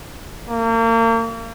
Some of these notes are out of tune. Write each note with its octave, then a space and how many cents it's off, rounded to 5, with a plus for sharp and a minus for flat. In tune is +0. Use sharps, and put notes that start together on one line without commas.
A#3 -35